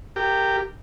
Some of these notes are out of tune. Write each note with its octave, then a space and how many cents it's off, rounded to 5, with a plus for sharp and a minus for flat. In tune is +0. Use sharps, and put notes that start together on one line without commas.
G4 +0 A#4 -25